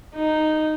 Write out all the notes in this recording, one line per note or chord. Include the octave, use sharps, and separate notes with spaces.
D#4